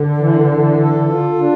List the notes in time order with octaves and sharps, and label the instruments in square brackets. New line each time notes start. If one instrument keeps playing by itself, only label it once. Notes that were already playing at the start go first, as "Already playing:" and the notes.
Already playing: [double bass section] D3
[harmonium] E3
E3
A4
F4
D4